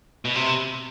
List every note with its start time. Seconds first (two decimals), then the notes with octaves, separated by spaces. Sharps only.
0.25 B2
0.36 C3